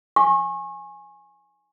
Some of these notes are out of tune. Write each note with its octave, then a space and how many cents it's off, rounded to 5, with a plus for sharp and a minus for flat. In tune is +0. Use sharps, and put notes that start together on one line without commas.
G#5 +0 C#6 -35